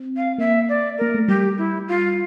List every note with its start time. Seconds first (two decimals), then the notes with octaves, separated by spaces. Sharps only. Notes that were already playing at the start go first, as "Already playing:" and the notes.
Already playing: C4
0.17 F5
0.38 A#3 E5
0.69 D5
0.98 A#3 A#4
1.15 A3
1.28 G3 G4
1.58 E4
1.88 F4